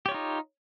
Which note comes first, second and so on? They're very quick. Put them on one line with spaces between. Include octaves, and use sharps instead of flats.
G4 C#5 F4 D#4